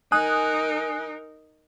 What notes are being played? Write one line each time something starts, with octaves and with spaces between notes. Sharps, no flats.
D#4 A#4 G#5 D#6 F#6